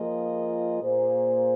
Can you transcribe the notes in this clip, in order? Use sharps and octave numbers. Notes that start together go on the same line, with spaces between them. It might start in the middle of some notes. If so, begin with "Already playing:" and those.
Already playing: F3 A#3 F4 G#4 D#5
A#2 A#3 G#4 C5